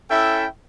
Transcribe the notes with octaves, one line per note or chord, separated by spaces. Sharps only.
C#4 E4 A4 E5 G5